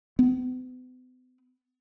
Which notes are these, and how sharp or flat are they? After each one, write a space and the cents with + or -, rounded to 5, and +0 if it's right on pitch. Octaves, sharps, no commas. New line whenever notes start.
B3 +45